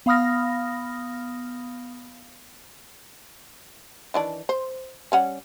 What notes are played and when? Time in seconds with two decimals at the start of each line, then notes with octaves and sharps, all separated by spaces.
0.06 B3 F5 B5 D#6 F6 A#6
4.14 D#3 E3 D4
4.49 C5
5.12 G3 C#4 F#5